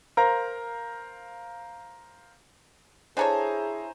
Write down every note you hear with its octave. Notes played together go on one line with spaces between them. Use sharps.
A#4 C5 F5 A#5
D4 E4 G#4 A4 C5 C#5 G#5 A#5